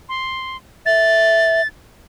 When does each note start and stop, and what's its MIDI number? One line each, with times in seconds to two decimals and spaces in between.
0.09 0.57 84
0.86 1.61 76
0.86 1.67 93